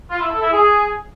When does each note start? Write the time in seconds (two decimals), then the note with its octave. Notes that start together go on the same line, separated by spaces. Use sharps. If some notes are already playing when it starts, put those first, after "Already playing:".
0.09 F4
0.20 E4
0.30 A4
0.41 E4
0.51 G#4